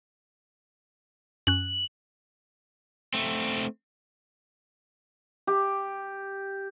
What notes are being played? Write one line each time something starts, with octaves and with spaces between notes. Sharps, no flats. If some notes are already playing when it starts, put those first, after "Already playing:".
F#2 C#4 F#6 F#7
A3 C4
G4